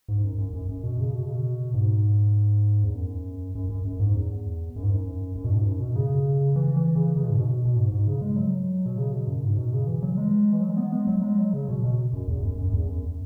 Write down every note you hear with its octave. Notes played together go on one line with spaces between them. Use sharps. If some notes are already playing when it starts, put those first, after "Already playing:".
G#2
F#2
F#2
F#2
F#2
B2
C#3
B2
C#3
B2
G#2
E2
F#2
F#2
F#2
F#2
G#2
E2
F#2
G#2
F#2
F#2
B2
G#2
F#2
B2
C#3
E3
E3
C#3
C#3
B2
G#2
B2
B2
G#2
G#2
C#3
G#3
F#3
B2
C#3
B2
F#2
G#2
B2
C#3
E3
F#3
G#3
E3
F#3
G#3
B3
G#3
F#3
G#3
F#3
C#3
B2
B2
F#2
E2
F#2
F#2
F#2
E2
F#2